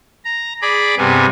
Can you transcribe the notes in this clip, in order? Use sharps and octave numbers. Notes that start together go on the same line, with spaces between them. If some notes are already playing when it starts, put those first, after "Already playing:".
A#5
G#4 D5 B5 D6
G2 C3 G3 B3 G#5